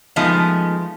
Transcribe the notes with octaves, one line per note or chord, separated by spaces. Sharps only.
F3 G#3 A3 B3 D#4